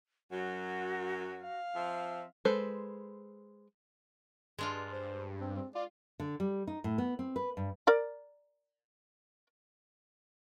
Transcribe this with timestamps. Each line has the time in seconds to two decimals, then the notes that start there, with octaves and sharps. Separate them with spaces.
0.31 F#2 F#3 F#4
1.42 F5
1.75 F3 C4 E5
2.45 G#3 A4 B4 C5
4.59 G2 G#3 D4 F4
4.92 C5
5.41 C4
5.56 C4
5.75 F4 D5
6.20 D3
6.40 G3
6.67 D#4
6.84 A2
6.98 B3
7.19 C4
7.36 B4
7.57 G2
7.87 A#4 D5 A#5